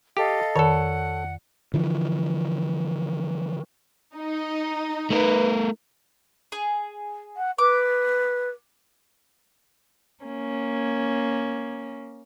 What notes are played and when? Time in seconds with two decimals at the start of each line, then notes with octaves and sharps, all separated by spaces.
0.17 G4 A4 D#5 F5
0.56 F2 D#3 A4 C#5 D5 F#5 A5
1.74 D3 E3 F3
4.16 D#4
5.10 A3 A#4 B4
6.52 G#4
7.37 F#5
7.58 B4 D6
10.23 A#3 C#4